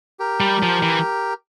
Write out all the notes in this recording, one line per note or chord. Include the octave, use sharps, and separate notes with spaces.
G4 A#4
G3
F3
E3